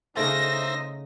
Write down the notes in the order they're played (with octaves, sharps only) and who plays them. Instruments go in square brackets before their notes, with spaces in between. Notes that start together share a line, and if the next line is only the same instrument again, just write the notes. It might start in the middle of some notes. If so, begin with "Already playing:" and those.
[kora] C#3 A3 [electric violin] D#4 D#5 [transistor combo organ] C5 E5 [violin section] A#6